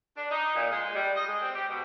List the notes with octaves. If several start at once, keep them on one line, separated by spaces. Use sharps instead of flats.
D4
D#4
A#2
G#3
G3
D#5
G#3
C4
G4
B2